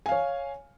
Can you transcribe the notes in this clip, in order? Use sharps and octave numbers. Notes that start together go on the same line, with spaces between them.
C#5 F5 G#5